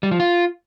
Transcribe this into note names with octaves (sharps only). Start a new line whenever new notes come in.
G3
F3
F4